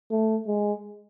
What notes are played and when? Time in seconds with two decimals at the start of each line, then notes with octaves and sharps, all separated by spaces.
0.11 A3
0.47 G#3